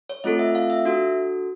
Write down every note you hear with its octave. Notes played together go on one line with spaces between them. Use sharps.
C#5
A3 C4 F4 A4 D#5
E5
F5
E5
D4 F#4 A4